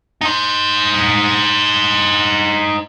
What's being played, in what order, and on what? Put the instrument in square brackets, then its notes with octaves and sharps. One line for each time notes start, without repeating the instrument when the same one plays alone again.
[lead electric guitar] D#4 C5